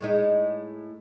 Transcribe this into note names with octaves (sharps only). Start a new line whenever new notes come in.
A2 G#3 D#4